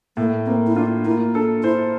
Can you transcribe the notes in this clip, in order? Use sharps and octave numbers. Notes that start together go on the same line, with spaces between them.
A2 A#3
A#3 C4
E4
D4 F4
A#3 E4
D4 A4
E4 C5